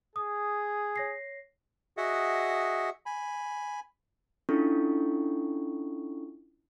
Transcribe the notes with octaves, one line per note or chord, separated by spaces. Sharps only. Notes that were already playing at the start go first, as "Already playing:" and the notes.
G#4 D#6
C#5 A#6 C7
F#4 G#4 D#5 E5 F#5
G#5 B5
C#4 D4 E4 F4 A4 C#6